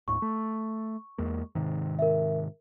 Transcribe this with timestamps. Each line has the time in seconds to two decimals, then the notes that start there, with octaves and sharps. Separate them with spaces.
0.08 D#2 A2 C#6
0.22 A3
1.18 E2 G#3 A#3
1.55 G#2 C3 D#3
1.99 A#4 E5